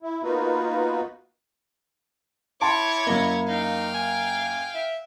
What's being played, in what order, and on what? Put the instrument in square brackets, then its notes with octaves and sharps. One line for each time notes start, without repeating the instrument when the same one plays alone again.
[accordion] E4
A#3 B3 D#4 F4 F#4 B4
[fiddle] E4 C#5 [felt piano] G5 A5 C6 [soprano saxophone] D6
[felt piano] F#2 A#3 [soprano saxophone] D#5
[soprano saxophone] D#4 [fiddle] F5 G5
[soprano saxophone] G#5
E5